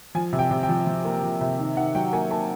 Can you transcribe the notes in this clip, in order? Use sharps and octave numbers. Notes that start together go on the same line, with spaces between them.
F3 G#5
C3
G5
C3
G5
F3
F3
A#3
F3
C3
D#3
D#3 F#5
F#3 G5
A#3 G#5
A#3 A5